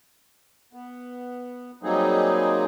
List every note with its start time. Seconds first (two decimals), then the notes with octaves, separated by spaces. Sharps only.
0.73 B3
1.83 F#3 G3 A#3 C4 D#4 G#4